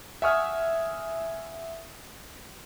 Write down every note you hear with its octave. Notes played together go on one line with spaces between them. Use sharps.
E5 F#5 G#5 C#6 D#6 F6